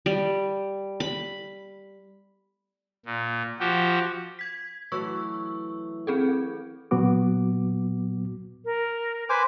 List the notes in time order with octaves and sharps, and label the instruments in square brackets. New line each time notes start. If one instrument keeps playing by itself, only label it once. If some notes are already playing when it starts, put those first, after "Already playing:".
[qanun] G3
B5
[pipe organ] A#2
F3 F#4 G4
[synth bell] G#6 B6
[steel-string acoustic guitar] E3 F#3 A3 [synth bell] C#6 E6
[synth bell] C4 G#4 A4
[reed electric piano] A#2 F#3 B3 F#4 D6
[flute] A#4
[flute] B4 [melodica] C5 G#5 D6